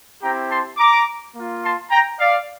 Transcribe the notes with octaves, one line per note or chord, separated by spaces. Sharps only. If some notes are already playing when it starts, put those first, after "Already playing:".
C4 E4 G4 G5 A#5
A5 C6
A#5 D6
A#3 F4
A5 C6
G5 A#5
D5 F5